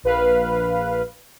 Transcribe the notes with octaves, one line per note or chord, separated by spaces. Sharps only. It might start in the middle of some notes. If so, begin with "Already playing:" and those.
A#1 B4 F5